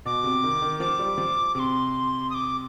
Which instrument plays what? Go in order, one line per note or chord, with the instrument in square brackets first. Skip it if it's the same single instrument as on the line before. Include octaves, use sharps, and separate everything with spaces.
[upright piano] B2 [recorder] D6
[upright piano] C3
D#3
D#3
[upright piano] F3 [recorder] D6
[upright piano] G3
F3
[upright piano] C3 [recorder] D6
[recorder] C6
D#6
D6